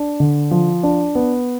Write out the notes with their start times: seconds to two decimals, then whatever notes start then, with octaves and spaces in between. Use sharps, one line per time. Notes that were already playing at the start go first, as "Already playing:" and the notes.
Already playing: D4
0.20 D3
0.51 F3
0.83 D4
1.15 B3